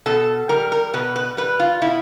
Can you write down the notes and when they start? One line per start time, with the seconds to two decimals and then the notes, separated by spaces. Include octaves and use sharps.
0.06 B2 A4
0.49 G3 A#4
0.72 A#4
0.94 B2 B4
1.16 B4
1.37 G3 B4
1.60 F4
1.82 B2 E4